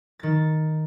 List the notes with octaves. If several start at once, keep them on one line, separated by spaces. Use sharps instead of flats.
D#3 A6